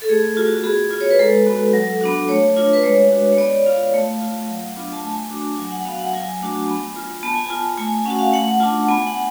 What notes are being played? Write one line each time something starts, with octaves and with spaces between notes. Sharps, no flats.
A4
A3 G#4
F4 F#4
F#4
B3 G#4
F4
C#5
B4
G#3 A4
B3 F#4
F#3
B3 D4 F#4
A3 C#5
D4 F4
B4
G#3 C#5
D4 F#4
C#5
B3 D5
F4 F5
A3
F4
F#3
B3 D4 F4
A5
A3 G#5
D4 F#4
F#3 G#5
F#5
B3 F#4 F5
F#5
F#3 G#5
A3 D4 F#4
B3
F4
B3 A5
G#5
F4 A5
A3 G#5
G#5
C#4 F#4 F#5
F5
A3 F#5
D4 F4 A5
B3 G#5
F#5